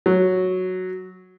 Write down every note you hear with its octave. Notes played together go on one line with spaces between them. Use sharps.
F#3